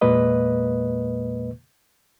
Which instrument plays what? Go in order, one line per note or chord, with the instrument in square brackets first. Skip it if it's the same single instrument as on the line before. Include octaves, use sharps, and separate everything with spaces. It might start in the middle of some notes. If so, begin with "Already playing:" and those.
[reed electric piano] E2 A#2 G#3 A#3 B4 D#5